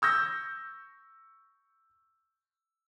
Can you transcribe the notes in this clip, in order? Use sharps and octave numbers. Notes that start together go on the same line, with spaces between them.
C#6 E6 G6 A#6